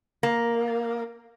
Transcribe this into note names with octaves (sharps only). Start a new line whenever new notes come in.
A#3